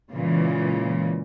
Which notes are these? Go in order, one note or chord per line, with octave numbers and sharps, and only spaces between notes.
A#2 C#3 E3 G#3